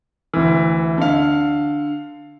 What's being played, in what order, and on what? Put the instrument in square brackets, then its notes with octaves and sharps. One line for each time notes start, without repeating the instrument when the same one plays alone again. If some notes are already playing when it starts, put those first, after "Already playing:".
[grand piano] D2 E3
D3 F5